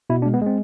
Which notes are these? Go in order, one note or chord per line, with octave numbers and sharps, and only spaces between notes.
B2 E4
D4
G#3
B3
G#3 C4